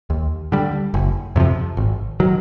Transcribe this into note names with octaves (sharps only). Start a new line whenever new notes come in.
D#2
D3 G3
F#1
F2 C3 F3
G#1
D#3 F#3